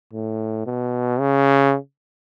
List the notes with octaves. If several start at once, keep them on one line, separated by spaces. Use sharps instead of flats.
A2
B2
C#3